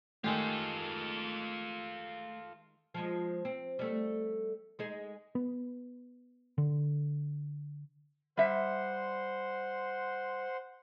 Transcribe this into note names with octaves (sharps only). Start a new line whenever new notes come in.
D#3 G#3 A3 F4 G4 A4
F3 G#3
C4
G3 A3
G#3 D#4 G#4
B3
D3
G3 C5 E5 F#5 C6